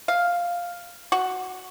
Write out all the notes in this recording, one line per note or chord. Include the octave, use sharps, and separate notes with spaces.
F5
F#4